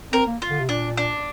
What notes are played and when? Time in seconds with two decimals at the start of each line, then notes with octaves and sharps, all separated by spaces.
0.13 C4 A#4
0.27 A#3
0.42 F4
0.51 D3
0.60 C3
0.69 A#2 D4
0.97 D4